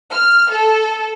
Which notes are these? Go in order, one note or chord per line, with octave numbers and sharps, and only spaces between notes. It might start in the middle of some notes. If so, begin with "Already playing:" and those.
F6
A4